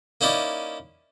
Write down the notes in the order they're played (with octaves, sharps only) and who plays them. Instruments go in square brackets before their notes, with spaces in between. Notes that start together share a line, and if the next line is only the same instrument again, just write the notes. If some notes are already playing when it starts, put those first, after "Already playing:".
[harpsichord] A#3 C#4 D#4 E4 D5